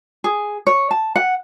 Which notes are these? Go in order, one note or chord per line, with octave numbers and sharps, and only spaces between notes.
G#4
C#5
A5
F#5